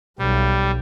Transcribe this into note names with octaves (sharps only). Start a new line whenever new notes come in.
B1 G3